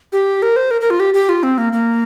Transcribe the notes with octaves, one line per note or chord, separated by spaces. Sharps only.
G4
A#4
C5
A#4
A#4
F4
G4
G4
F4
C4
A#3
A#3